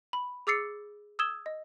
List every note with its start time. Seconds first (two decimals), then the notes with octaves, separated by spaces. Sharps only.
0.13 B5
0.47 G#4 D6 E6 A6 C7 C#7
1.19 D#6 E6 G#6 E7 G7
1.46 D#5